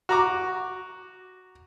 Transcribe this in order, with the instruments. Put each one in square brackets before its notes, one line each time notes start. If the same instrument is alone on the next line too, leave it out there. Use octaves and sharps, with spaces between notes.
[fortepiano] F#4 A#5 D6